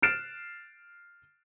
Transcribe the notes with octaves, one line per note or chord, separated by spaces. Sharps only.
F6 F#6 A6 C7 D7 E7